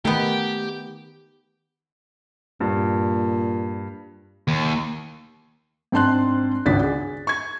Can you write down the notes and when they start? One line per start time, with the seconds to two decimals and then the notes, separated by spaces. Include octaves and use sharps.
0.05 D#3 A3 B3 G4
2.60 G2 A#2
4.48 D#2
5.92 G#2 C4 D4 A5 C6 F#6
6.66 G#1 C#2 C#4 D4 A6 B6
6.83 G#4
7.27 C#6 G#6